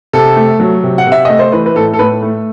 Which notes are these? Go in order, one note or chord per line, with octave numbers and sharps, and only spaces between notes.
C3 A4
A3
F#3
C3
F#5
C3
E5
A3 D#5
C5
E3 B4
B4
A2 A4
A4
A2 B4
A3